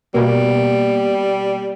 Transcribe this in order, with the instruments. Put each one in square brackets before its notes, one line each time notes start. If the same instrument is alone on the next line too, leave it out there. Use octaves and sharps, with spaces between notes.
[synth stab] B2 A#3 [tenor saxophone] G3